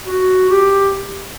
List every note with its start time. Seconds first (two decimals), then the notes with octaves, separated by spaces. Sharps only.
0.06 F#4
0.50 G4